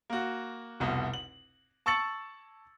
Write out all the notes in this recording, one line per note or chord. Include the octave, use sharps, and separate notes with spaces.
A#3 F#4
F1 C2 B2
F#7
A5 C#6 E6 A6 C#7 F#7